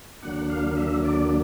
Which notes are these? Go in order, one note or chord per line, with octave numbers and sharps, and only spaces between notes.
D#2 D3 F#3 A#3 D4 F#5
F5
E5
D5